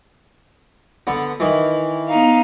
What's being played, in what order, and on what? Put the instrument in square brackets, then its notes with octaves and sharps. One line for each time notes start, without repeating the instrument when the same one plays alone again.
[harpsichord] D3 B3
D#3 E3
[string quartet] B3 D#4 F5